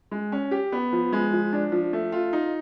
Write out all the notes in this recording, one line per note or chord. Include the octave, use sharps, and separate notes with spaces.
G#3
C#4
G4
B3
F3
G#3
F3
D4
F3
A3
F4
D#4